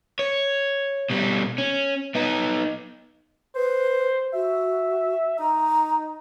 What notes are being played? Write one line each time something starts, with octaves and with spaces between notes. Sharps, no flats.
C#5
B2 G3
C#4
B3 D#4
B4 C5
F#4 E5
D#4 A#5